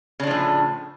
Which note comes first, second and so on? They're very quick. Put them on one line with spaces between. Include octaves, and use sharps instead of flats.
C#3 D4 F3 A2